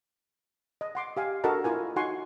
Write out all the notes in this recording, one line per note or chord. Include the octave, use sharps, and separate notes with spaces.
D#5
F#5 C6 D6
G4 F5 G#5
D4 F#4 A4 A#4 D#5 A5
E4 F4 A#4 G#5
D#4 F#4 F#5 G#5 C6 C#6